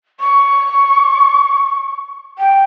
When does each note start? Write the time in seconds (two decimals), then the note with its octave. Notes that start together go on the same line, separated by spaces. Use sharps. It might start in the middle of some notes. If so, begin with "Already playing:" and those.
0.20 C#6
2.39 G5